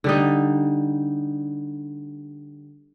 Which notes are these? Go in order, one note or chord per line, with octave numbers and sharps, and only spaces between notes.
D3 G3 D#4